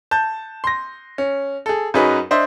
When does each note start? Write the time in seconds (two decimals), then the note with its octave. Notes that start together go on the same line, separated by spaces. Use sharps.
0.11 A5 G6
0.64 C6 A#6
1.18 C#4
1.66 G#4 A4
1.94 F#2 F#3 D#4 G#4 B4
2.31 D4 C5 D#5 E5